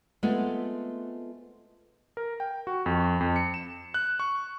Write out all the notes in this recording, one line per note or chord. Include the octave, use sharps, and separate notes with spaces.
G#3 A3 B3 C4 F4 A4
A#4
G5
F#4
F2
F2
C#7
E7
F#6
C#6